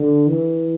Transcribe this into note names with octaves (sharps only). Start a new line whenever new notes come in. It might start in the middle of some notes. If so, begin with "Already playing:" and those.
Already playing: D3
E3